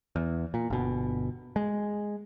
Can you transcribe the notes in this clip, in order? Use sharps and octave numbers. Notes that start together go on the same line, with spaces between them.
E2
A#2
G1 B2
G#3